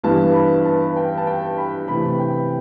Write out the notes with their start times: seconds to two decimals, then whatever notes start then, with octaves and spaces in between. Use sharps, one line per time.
0.03 G2 E3 B3 A5
0.34 B5
0.65 A5
0.96 G5
1.18 A5
1.27 G5
1.57 B5
1.88 C3 E3 A3 B5
2.19 G5